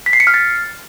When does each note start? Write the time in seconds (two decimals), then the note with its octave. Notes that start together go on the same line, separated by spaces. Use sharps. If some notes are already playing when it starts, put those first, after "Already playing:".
0.06 B6
0.13 C7
0.20 C#7
0.27 F6
0.34 A6